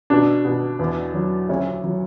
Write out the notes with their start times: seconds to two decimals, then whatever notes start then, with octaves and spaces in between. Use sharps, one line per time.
0.10 B2 D4
0.45 B2
0.79 E2
1.14 F#3
1.49 D2 C#4
1.84 F#3